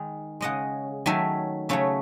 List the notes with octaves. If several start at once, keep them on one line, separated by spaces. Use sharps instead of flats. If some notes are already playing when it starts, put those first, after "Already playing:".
Already playing: D#3 G#3
C#3 G#3 D#5 F#5
D#3 F#3 A3 E5 G#5
C#3 F#3 A3 C#5 E5